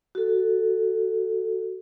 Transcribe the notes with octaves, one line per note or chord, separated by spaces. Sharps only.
F#4 A4